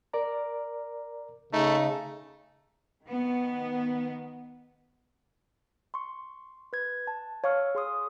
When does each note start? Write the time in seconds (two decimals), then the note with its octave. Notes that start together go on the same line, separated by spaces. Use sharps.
0.13 A#4 D5 A#5
1.53 C#3 A3 D#4
3.03 D#3 B3
5.94 C6 C#6
6.73 B4 G#6
7.07 A5
7.44 C#5 F5 C#6 E6 F6
7.75 G#4 C6 D#6